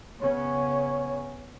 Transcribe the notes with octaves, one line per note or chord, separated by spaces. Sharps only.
C#3 B3 C#4 C#5